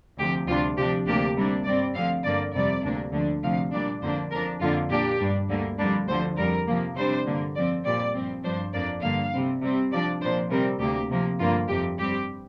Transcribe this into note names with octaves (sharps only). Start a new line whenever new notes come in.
D2 C3 F3 G4
D2 C3 G3 D4 F4
C3 F3 D4 G4
D2 C3 A#3 D4 G4
C3 G3 A#3 D4
G2 G3 C4 D5
D2 D3 F3 C4 F5
G2 D3 A#3 D5
F2 C3 G3 D5
D2 C3 A#3 D4
D2 D3 F3 D4
D2 C3 F3 F5
A#2 G3 D4 D5
F2 D3 A#3 D4 C5
F2 F3 D4 A#4
F2 D3 A#3 D4 F4
A#2 A#3 D4 G4
G2 G3 D4
D2 D3 G3 A#3
F2 D3 G3 A#3 D4
D2 D3 F3 C5
F2 D3 G3 A#4
C3 F3 A#3
C3 G3 D4 C5
G2 D3 F3 A#3
F2 F3 C4 D5
A#2 G3 C4 D5
G2 F3 C4
G2 F3 D4 C5
F2 F3 A#3 D4 D5
G2 D3 A#3 F5
C3 G3 C4
C3 G3 C4
C3 F3 D4 D5
A#2 F3 D4 C5
C3 G3 C4 A#4
D2 C3 A#3 G4
C3 F3 A#3
G2 D3 F3 A#3 F4
F2 C3 F3 G4
G2 G3 C4 G4